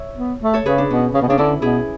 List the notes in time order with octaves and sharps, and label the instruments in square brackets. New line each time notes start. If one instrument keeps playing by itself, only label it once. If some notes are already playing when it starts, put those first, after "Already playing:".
Already playing: [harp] C#5 E5
[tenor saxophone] B3
A3
[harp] A4 C#5
[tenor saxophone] C#3 [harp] G#4 B4
[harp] D4
[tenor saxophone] B2 [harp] C#4
[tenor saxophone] C#3
B2
[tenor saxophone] C#3 [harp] D4
[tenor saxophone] D3 [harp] C#4 E4
[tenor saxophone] B2 [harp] E4 G#4